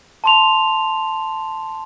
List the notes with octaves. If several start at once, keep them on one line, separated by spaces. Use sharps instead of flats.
A5 C6 F7